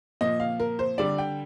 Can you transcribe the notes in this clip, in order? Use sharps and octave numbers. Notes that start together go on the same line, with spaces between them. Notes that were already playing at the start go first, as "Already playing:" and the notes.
A#2 F3 D#5
F5
A#4
C5
D3 G3 D5
G5